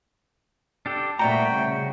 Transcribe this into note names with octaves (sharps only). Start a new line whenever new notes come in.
D4 G4 A4
C2 A#2 A3 F#4 D5 G5 A#5
C#3